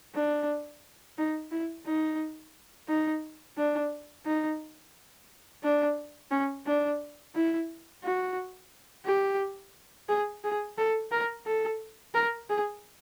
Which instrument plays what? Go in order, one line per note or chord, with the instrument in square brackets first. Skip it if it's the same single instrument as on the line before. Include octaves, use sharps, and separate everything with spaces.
[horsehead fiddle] D4
D#4
E4
D#4
D#4
D4
D#4
D4
C#4
D4
E4
F#4
G4
G#4
G#4
A4
A#4
A4
A#4
G#4